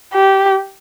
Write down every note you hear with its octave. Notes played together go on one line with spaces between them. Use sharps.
G4